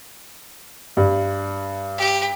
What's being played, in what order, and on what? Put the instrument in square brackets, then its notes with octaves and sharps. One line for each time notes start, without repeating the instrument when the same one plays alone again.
[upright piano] G2
[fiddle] G4